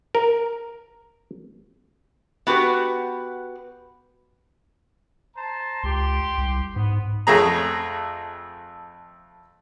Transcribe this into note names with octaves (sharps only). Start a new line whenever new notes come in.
A#4
B3 F#4 G4 B4
C5 A5 A#5
C#2 G4 C6
C2
G#2 B3
F2 A3 G#4 A#5